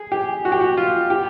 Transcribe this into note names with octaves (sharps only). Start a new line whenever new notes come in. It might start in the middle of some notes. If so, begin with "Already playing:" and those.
Already playing: G#4
G4
F#4
G4
F#4
F4
G4